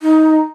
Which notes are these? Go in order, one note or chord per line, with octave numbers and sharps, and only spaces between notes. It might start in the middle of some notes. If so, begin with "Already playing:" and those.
D#4